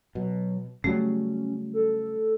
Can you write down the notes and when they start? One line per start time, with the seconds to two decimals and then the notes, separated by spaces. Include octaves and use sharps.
0.15 B2 F#3
0.84 C#3 F#3 G3 A3 C#4
1.73 A4